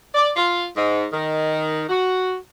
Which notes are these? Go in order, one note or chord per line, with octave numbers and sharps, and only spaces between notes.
D5
F4
G#2
D#3
F#4